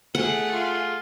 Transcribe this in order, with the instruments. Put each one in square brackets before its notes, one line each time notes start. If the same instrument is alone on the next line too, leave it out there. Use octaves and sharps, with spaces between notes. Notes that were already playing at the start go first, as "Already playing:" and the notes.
[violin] A3 G#4 [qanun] F#5
[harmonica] F4